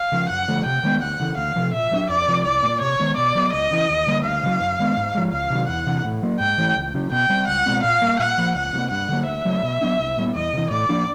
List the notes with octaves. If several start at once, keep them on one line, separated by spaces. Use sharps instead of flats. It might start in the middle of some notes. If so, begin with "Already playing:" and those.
Already playing: F5
C#3 F3
F#2 F#5
D3 F3 A3
C3 G5
D#3 G#3 B3
D2 F#5
C#3 E3
D2 F5
C3 F3
A#2 E5
F#3 B3 D4
F2 D5
C3 F3
C2 D5
A#2 G3 A#3
C3 C#5
D#3 G#3 B3
B2 D5
F#3 B3
C#2 D#5
C#3 E3
D#2
D3 G3 A#3
D2 F5
C#3 F#3
F#2
D#3 G#3 B3
G#2
F3 G#3
C#2 F5
C3 D#3 F#3
E2 F#5
C3 E3
A2
F#3 A#3
G#2 G5
E3 A3
C#2
C#3 F#3
B2 G5
G3 C4
C#2 F#5
B2 G#3 C4
A#2 F5
G3 A#3
A#2 F#5
F3 A#3
C#2 F#5
C3 F3 A#3
G2 F#5
D3 F#3 A#3
D2 E5
C#3 F#3 A3
B2
F#3 B3 D4
C2
A#2 G3 B3
E2 D#5
C3 E3
A2 D5
F3 A#3 D4